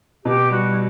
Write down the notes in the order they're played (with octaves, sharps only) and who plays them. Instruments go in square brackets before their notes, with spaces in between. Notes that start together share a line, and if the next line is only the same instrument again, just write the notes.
[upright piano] B2 [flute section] G4
[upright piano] G3 [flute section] F#4
[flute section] E4